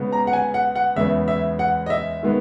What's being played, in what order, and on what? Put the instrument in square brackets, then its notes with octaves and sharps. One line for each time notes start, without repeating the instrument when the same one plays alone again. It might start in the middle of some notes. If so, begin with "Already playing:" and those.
Already playing: [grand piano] C#3 G#3 B3
A#5
F#5
G#5
F#5
F#5
E2 C#3 G#3 B3 E5
E5
F#5
D#5
E5
D#3 G#3 B3